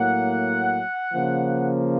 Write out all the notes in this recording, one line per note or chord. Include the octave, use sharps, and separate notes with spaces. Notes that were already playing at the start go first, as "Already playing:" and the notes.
Already playing: A2 F#3 A#3 F#5
C#3 F3 A#3